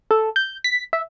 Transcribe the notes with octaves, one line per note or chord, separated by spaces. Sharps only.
A4
G6
B6
E5